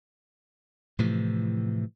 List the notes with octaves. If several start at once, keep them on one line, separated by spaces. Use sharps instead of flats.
A2 C3 E3 F3